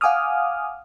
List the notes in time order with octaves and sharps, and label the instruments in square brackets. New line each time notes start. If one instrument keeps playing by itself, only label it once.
[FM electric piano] F5 F#5 G#5 D6 D#6 F6